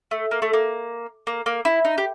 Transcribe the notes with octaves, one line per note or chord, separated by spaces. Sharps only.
A3
A#3
A3
A#3
A#3
A#3
E4
D#4
G4